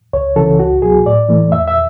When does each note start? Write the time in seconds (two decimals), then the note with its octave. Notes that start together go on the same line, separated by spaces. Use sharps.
0.13 C#2 C#5
0.36 C#3 E3 A4
0.59 C#2 F#4
0.82 B2 F#3 G#4
1.06 A2 D5
1.29 E3 A3
1.51 E2 E5
1.67 E5